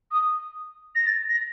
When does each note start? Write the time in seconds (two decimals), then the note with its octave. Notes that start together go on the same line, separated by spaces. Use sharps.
0.11 D#6
0.95 A#6
1.06 A6
1.29 A#6